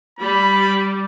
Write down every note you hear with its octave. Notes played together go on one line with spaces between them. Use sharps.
G3 B5